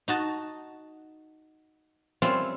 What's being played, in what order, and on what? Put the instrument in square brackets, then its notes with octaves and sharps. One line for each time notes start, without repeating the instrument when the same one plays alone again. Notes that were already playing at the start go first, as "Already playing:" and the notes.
[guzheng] D#4 F#4 A5
G3 C4 C#4 F4 E5 C6